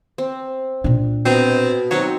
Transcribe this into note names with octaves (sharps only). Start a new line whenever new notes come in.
C4
A#2 D4
B2 C4 D#5 A#5
F#3 C4 D#4 F#4